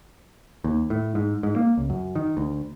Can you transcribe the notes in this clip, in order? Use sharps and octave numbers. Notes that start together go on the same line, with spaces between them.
D#2
A2
G#2
G#2
A#3
C#2
F#2
D#3
D2